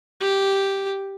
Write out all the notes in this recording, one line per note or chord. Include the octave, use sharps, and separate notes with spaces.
G4